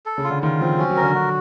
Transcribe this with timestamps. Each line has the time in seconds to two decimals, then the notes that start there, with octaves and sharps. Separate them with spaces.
0.06 A4
0.18 C#3
0.24 F4
0.30 D3
0.43 D#3 F4
0.61 F3 C4
0.78 F#3 C#4
0.90 F#3
0.96 A#4
1.03 D3
1.15 D3 F#4